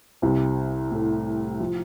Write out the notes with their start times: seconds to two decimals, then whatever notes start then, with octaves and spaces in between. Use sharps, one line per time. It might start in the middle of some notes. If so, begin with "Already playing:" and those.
0.22 C2 C3
0.91 A2 A3
1.60 F3